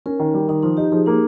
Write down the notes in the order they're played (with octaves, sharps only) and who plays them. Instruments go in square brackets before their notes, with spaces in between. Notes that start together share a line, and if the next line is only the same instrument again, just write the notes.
[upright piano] C#4 [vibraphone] A#4
[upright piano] D#3
G3
[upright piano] D#3 [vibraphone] D#4
[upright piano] F3 [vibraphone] D#4
[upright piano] D#4 [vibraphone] G4
[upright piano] F3 [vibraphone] G#4
[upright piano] A#3 [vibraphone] D#4